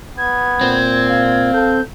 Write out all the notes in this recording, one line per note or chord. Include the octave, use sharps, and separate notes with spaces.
B3 G#6
A#2 C4
F5
A4 G6